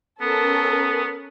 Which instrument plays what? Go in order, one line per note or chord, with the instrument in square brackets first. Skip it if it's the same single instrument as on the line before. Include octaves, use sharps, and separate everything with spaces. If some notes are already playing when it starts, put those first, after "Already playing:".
[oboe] B3 [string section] C#4 A4 A#4